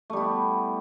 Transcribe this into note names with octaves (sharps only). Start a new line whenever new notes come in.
G3 A3 B3 E4